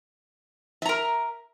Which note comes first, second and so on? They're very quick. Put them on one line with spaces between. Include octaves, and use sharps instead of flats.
E5 A#5 A#4